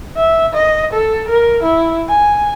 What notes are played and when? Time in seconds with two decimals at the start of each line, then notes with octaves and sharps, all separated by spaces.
0.17 E5
0.54 D#5
0.93 A4
1.28 A#4
1.63 E4
2.09 G#5